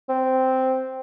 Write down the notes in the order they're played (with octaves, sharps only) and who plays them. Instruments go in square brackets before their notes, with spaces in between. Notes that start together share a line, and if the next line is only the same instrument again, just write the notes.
[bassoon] C4